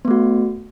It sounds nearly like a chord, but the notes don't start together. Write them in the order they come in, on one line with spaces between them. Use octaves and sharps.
B3 A3 F#4